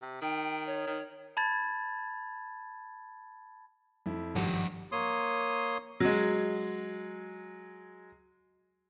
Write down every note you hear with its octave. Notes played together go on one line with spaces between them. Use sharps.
C3
D#3 G5
C#5
D#3
A5 B5 G#6 A6
F2 E4
G#1 G2 F3 G4 F#5
A#3 C#5 C6 D#6
F#3 G#3